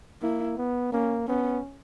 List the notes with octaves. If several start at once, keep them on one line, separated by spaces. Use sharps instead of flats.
A#3 E4
B3
A#3 C#4
B3 C#4